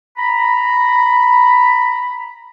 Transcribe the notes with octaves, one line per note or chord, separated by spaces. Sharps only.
A#5 B5